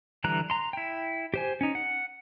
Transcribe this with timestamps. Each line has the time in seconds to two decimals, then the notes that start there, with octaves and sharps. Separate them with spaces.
0.24 D3 E3 G3 A#5 F#6
0.50 A#5 C6
0.73 E4 G5
1.34 G4 C5 G#5
1.61 C#4 D#4
1.75 F#5